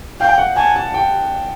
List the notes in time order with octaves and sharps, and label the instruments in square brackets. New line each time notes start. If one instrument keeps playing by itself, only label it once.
[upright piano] F5 [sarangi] G5
[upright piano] F#5
[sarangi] G#5 [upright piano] A5
[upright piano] A5
G5